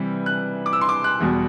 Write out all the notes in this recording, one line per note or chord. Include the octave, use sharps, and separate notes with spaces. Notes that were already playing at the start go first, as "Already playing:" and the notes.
Already playing: C3 E3 G3
F#6
D6
E6
C6
D6
F#6
E2 B2 G3